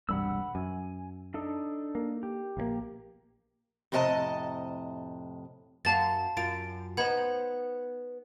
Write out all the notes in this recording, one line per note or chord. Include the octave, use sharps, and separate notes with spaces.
E1 C2 G2 F#5 B5 E6
F#2 G#5
D4 D#4 A4
A#3
G4
A#1 D#3 A#3
F2 A2 C3 D#5 A5
F#2 F#4 C#5 F5 A5 A6
F#2 F4 A6 D7
B3 D#4 C5 F#5 B5 G#6